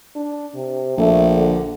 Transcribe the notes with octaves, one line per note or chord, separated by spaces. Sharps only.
D4
C3
A#1 A3
D3